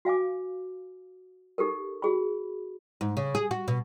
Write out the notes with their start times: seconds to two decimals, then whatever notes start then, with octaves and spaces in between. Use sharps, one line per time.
0.05 F#4 F5 G#5 D6
1.58 D#4 G4 A4 A#4
2.02 F#4 G#4 B5
3.01 G#2
3.17 C#3
3.35 G#4
3.51 F#4
3.68 B2